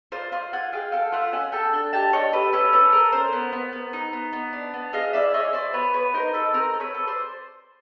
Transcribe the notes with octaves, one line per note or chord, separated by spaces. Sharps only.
F4 C5 D5
F4 C5 D5
F4 F#5 G#5
G#4 F5 G5
A4 F5 G5
F4 E5 F#5
C#4 F#5 G#5
A4 G5 A5
D4 G5 A5
G4 G5 A5
D4 C#5 D#5
G4 A4 B4
C#4 A4 B4
C#4 A4 B4
A4 A#4
C#4 A#4 C5
B3
B3
B3
D#4
B3
B3
D4
B3
G#4 D#5 F5
E4 D5 E5
G#4 C#5 D#5
E4 C5 D5
B3 B4 C#5
B3 B4 C#5
D#4 A#4 C5
D#4 A4 B4
C4 A#4 C5
A4
B4 C#5
A4
C5 D5